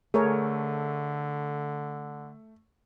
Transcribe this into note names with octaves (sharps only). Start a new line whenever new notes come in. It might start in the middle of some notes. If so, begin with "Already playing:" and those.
D3 A3 G#4 A#4 C#5